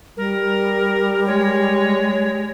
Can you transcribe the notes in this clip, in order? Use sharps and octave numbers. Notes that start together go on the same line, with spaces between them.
G3 A#4
G#3 C#5